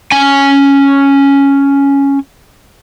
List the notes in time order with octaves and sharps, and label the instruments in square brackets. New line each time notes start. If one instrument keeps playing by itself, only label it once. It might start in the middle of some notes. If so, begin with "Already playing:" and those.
[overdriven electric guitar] C#4 G#5